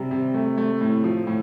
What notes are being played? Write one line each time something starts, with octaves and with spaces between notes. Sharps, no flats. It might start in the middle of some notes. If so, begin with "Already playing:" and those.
Already playing: C3 G3
C3
A3
A3
A2
F3
A2